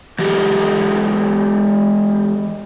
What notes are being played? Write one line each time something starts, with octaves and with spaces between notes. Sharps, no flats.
E3 G#3 G4